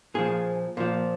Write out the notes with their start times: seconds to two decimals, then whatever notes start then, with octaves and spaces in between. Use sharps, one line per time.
0.14 A#2 F3 G#4
0.77 A#2 F3